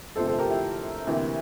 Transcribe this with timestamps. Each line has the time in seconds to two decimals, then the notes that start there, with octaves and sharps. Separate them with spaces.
0.16 G1 F2 C3 F3 A3 A4 C5
0.27 A4 C5
0.39 G4 A#4
0.50 E4 G4
1.07 D2 C3 E3 A#3